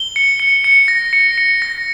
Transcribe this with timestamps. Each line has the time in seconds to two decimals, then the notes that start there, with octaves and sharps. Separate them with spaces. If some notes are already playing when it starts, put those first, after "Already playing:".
Already playing: G7
0.16 C#7
0.40 C#7
0.64 C#7
0.88 A#6
1.13 C#7
1.38 C#7
1.62 A#6